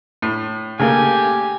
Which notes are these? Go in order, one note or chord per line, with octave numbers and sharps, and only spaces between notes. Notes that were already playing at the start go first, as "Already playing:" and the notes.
A2
C#3 A3 A#3 G4 G#5